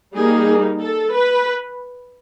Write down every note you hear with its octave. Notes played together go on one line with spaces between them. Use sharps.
G3 A#3 D#4 G#4
A4
B4